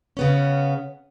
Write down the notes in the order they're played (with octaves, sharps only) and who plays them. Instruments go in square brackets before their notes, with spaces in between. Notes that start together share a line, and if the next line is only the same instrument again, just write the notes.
[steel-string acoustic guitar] C#3 B3 C#4